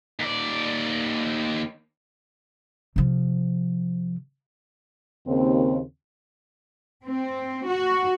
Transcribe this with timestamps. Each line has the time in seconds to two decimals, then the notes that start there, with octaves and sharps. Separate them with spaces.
0.19 D#2 D5
2.96 C3 F3
5.27 D#2 C#3 C4
7.07 C4
7.70 F#4